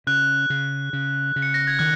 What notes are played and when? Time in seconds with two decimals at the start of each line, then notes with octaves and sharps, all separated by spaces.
0.07 C#3 F#6
0.50 C#3
0.93 C#3
1.36 C#3
1.42 C#7
1.54 A#6
1.67 G#6
1.79 D#3 F#6